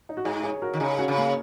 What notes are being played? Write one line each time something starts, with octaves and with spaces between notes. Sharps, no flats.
D#4
F#4
G#2 D#4 G#4
G#4 C#5
F#4 A#4
D#3
C#3 D#4 G#4
C#4 F#4
C#3
A#3